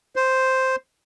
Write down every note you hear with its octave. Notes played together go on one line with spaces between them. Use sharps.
C5